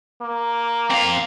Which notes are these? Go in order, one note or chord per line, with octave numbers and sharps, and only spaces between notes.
A#3
C4 F5